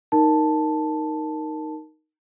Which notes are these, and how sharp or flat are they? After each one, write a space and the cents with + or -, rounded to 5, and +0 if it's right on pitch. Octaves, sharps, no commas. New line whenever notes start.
D#4 +0 A#4 +0 A5 +0